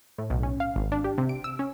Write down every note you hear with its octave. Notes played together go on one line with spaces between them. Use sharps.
A2
B1
C#4
F5
G#1
D4
G4
C3
D7
E6
C#4